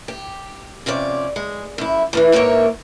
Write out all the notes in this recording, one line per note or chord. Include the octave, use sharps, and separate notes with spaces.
G4
F2 C3 C#4 D5
G#3
F#2 E4
E2 A2 E3
G#2 A#3 A#4 C#5 E5